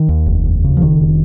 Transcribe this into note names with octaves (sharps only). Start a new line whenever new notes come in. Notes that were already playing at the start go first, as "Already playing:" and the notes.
Already playing: D#3
D#2
F1
D#2
C#3
F3
F1 D#3
F1